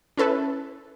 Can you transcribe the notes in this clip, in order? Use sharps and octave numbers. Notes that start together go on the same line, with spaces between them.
C#4 E4 A4 B4